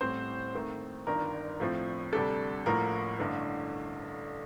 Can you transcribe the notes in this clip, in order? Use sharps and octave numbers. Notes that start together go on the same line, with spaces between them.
A1 A2 G3 C4 C5
D#2 D#3 A3 C4
G1 G2 D#3 A#4
A2 F3 A3 C4
D2 C3 G3 D4 A4
A1 A2 F3 A#3 A#4
A1 G2 D3 A3